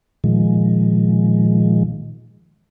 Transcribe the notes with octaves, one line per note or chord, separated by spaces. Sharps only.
A#2 D#3 F3 G#3